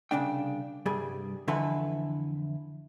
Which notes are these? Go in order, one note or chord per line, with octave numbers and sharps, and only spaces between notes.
C2 C#3 D4 G5
C2 G2 G3 G#4
F2 D3 E3 E4 B4 C6